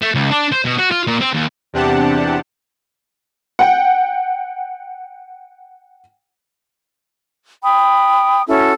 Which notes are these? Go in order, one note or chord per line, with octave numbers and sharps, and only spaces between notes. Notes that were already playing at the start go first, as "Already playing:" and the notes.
A3
C#2
D4
C5
B2
F#4
F4
A#2
C4
D#2
E2 C3 D4 G4 F#5 A5
F#5 G5
G5 B5 D#6
C#4 E4 F#4 A4